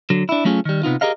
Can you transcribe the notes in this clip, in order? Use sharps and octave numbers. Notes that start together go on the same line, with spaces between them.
D3 F#3
D4 E4
F#3 A3 C#4 F4 G#4
D#3 G3
C3 B3 D#4 F4
G4 G#4 A#4 D#5 F5